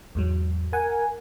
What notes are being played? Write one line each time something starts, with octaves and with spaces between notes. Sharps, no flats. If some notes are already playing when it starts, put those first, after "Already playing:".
E2 G#2 F#3
A#4 F#5 G#5